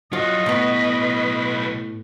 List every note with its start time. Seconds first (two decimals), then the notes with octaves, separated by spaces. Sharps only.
0.13 F#3 F4 F#4 D#5
0.46 B1 A2 B3 B4